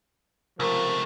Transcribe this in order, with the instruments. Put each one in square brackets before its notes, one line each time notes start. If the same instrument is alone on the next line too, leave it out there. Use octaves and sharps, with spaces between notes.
[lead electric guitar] C#2 A3 [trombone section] C3 F3 A#4